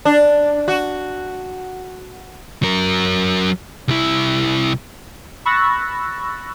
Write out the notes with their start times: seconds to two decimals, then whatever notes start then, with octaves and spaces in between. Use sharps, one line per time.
0.05 D4
0.68 F#4
2.63 F#3 A#4
3.88 C2 E4
5.45 B5 C#6 E6 F#6 A6 A#6